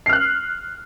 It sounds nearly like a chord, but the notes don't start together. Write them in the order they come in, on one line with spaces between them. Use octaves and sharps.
C7 F6 F#6